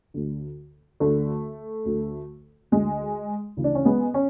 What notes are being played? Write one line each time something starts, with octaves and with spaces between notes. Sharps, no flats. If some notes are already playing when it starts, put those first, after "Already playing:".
D2 D3
D2 D3 A3
D2 D3
D2 D3 G#3
D2 C#3 E3
D4
C#4
G#3 B3
C#4